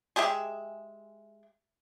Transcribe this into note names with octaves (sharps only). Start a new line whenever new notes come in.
G#3 G4 G#4 E5